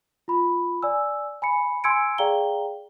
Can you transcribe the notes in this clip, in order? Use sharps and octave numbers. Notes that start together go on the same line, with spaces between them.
F4 B5
D5 G#5 E6
G#5 B5 C#7
G#5 C6 E6 G#6 C#7 D7
G#4 D5 F5 G5 A#5 G7